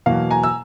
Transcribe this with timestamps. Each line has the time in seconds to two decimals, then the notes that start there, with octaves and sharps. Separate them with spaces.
0.06 E2 B2 F#3 A#3 F5
0.31 G#5 A#5
0.43 E6